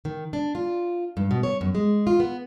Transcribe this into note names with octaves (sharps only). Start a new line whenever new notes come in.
D#3
D4
F4
G2
B2
C#5
F#2
G#3
F4
B3